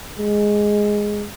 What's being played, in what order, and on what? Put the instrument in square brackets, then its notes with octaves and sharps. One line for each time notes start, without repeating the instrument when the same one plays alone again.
[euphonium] G#3